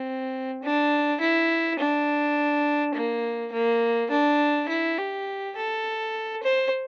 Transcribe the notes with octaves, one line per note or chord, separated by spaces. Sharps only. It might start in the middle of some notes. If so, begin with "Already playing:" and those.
Already playing: C4
D4
E4
D4
A#3
A#3
D4
E4
G4
A4
C5